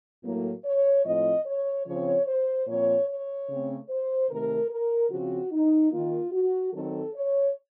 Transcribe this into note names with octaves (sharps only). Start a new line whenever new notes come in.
A2 F#3 A#3
C#5
A2 F3 C4 D#5
C#5
C#3 F3 C4 C#5
C5
A#2 F3 C4 C#5
C#5
C#3 A3 C4
C5
C3 D#3 A3 A#4
A#4
C#3 F3 C4 F#4
D#4
D#3 A#3 F4
F#4
D#3 F#3 C4 A4
C#5